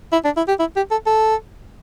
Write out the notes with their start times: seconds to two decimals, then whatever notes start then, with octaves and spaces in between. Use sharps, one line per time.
0.12 E4
0.24 D4
0.37 E4
0.48 G4
0.59 E4
0.76 G4
0.91 A4
1.07 A4